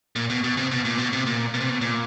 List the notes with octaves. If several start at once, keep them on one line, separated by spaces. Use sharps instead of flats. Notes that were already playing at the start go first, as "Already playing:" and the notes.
A#2
B2
B2
C3
B2
A#2
B2
C3
A#2
B2
C3
B2
A#2